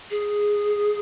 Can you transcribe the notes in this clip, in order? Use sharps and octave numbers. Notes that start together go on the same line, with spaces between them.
G#4